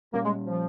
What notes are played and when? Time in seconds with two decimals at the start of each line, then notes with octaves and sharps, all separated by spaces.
0.13 A#2 G3 A#3 C#4
0.24 G#3
0.46 F3